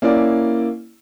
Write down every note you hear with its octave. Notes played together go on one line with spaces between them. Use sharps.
A#3 C#4 E4 D5